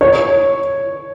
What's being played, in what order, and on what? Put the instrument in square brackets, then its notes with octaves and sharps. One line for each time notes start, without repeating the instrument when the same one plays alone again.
[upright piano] C#5